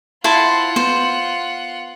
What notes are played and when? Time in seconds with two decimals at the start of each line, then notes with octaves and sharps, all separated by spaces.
0.24 E4 F4 C5 F#5 A5
0.76 B3 C5